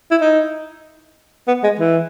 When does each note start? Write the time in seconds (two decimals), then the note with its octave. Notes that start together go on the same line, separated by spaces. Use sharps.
0.11 E4
0.21 D#4
1.47 B3
1.64 G#3
1.79 E3